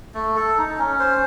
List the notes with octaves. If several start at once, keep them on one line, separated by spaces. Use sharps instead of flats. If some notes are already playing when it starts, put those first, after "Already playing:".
A3
A4
D#4
C#4
C5